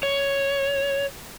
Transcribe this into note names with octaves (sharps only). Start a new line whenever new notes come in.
C#5